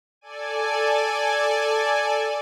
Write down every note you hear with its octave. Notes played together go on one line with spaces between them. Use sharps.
A4 D5 G#5